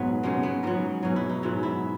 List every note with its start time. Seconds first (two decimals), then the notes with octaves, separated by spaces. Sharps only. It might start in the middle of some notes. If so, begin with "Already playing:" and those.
Already playing: G#2 B2 F#3 B3 F#4
0.23 C#3 G#3 A#3
0.43 B3
0.63 G#2 F#3 A#4
1.03 B2 F#3 G#4
1.16 E4
1.29 D#4
1.43 G#2 F#3 E4
1.63 E4